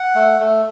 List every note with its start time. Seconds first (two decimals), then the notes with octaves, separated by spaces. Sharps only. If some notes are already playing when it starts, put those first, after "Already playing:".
Already playing: F#5
0.15 A3
0.40 A3